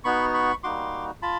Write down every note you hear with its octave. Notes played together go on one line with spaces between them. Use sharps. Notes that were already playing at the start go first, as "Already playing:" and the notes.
B3 D#4 F#4 B5 C#6
B5 C#6
G3 A#3 D#4 F#4 C6 D6
F4 A5 B5